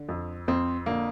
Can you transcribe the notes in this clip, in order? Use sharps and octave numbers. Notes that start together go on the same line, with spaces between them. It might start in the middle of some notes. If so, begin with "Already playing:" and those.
Already playing: D3
F2
F2 C4
D3 A#3